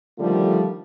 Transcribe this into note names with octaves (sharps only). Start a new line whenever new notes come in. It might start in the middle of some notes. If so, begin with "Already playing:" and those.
D3 D#3 F3 G3 A3 F4